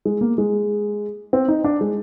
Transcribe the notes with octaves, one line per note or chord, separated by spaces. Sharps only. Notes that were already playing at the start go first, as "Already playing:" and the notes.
G#3
A#3
G#3
C4
D#4
D4
G#3